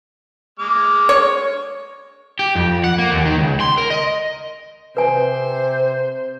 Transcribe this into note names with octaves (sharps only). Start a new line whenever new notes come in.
G#3 D6 F6
C#5
G4
F2
F#5
A#3
D#2
D#3
C#2
C6
A#4
D#5
C3 B4 C5 G#5